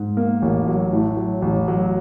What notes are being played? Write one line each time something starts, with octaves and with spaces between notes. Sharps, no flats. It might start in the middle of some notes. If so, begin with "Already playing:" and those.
Already playing: G#2
A#3
A1
F#3
A2
F#3
A1
F#3